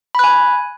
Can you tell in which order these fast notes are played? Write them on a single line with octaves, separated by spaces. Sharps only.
B5 F#6 G#5